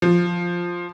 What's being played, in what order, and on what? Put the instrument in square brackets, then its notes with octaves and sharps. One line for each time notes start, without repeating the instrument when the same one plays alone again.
[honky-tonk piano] F3